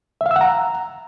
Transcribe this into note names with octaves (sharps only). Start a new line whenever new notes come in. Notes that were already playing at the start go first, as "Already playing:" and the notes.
E5
F5
E6
F#5
A#5